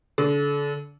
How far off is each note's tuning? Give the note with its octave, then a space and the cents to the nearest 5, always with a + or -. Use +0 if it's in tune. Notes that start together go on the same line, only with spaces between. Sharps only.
D3 -30